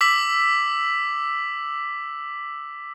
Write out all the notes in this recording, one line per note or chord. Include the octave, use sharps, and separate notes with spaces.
D6 E6 B6 F#7